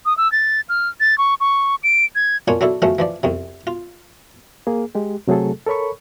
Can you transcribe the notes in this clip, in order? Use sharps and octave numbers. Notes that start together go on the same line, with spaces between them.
D#6
E6
A6
F6
A6
C#6
C#6
D7
G#6
A#3 C#4 D4 F4 C#5
F#3 D4 E4 A4
C#3 F3 F#3 A3 C#4
E3 F3 D5
C2 F2 C3
F4
A#3 G#4
G#3 G4
C3 F#3 A3 G#4 A4
A4 A#4 C#5 B5 C#6